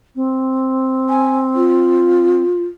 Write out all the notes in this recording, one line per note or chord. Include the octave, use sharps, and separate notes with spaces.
C4
G#5
F4